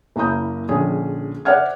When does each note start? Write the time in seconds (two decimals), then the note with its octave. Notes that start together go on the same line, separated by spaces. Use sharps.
0.16 F#1 A#3 E4 A#5 D#6 G6
0.69 A#1 D3 C#4 G#4 D#6
1.45 C5 D5 E5 F#5 F6 G#6